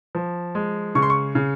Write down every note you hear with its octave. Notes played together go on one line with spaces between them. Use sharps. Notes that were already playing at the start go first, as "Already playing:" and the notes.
F3
G#3
C#3 C#6
C6
C#6
C#3